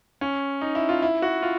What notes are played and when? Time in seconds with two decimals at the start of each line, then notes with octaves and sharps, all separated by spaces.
0.21 C#4
0.61 D#4
0.75 E4
0.89 F4
1.02 E4
1.22 F#4
1.42 F4